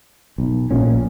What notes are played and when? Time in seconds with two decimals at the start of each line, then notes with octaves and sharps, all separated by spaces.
0.38 B1
0.71 A#1 A#2 C#4